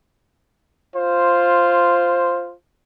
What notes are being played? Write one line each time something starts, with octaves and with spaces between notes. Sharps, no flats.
F4 C5